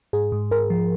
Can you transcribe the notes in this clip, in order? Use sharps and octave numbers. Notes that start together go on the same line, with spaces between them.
G#2 G#4
G#2
G#2 A#4
F3